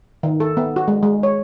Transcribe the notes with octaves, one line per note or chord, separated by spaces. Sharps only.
D#3
A4
B3
F#4
G#3
G#3
C#5